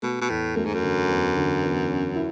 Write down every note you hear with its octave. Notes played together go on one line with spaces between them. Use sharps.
B2 A3
B2
E2 A2
F#2 A3
G#2
F#2
D3
E2
D3
E2
C#4
E4